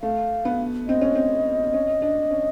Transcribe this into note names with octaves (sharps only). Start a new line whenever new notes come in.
A3 F5
B3
C4 D#5
C#4
C4
C#4
D4
C#4